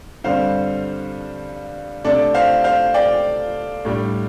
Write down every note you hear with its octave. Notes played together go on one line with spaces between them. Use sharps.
G2 D3 G3 C4 C5 F5
C3 A3 D4 A4 D5
C5 F5
C5 F5
D5 G5
A2 G3 D4